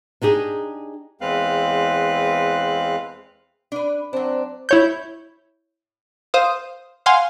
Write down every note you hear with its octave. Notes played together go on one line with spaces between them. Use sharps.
D4 D#4 G4 G#4
E2 G#3 C4 B4 F5 F#6
D4 B4
F#3 C4 D4
E4 C#5 G6
C5 F5 D#6
F5 F#5 G#5 C6